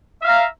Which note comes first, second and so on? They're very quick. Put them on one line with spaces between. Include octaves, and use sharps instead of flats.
E5 F5 A#5